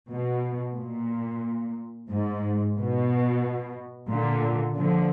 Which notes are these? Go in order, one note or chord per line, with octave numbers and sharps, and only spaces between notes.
B2
A#2
G#2
B2
A#2 D3
D3 F3